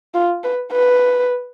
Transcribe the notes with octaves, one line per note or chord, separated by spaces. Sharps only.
F4
B4
B4